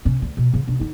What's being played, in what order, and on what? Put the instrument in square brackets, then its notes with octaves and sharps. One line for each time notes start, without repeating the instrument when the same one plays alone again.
[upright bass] C3 C#4
D2
B2
C#3
C3 D4
D3 D#4